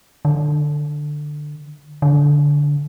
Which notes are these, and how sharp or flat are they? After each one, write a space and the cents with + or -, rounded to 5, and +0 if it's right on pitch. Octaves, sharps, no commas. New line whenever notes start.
D3 +15
D3 -15